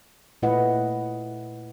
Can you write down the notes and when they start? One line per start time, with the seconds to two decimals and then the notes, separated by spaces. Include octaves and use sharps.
0.42 A#2 A3 E4 B4 D#5 F#5